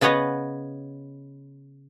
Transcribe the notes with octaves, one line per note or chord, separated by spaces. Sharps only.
C#3 B3 B4 C#5 D#5 F#5